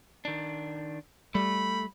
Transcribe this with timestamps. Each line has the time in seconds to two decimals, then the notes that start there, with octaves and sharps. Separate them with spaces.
0.25 D#3 D4
1.35 G3 A3 B5